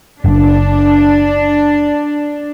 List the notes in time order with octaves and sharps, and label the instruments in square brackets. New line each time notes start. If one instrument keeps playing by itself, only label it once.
[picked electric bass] F#1 [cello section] D4